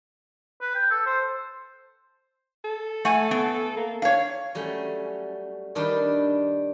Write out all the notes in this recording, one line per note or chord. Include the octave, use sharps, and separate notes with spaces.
B4
G5
A4
C5
A4
A3 F#5 G#5
B3
A#3
D4 C#5 F5
F#3 G3 A3 C#4
D#3 G3 D4 B4